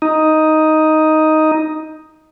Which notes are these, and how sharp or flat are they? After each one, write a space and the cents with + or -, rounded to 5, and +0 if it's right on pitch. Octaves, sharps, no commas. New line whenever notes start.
D#4 +5